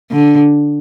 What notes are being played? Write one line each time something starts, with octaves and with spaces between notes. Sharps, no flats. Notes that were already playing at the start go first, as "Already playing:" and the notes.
D3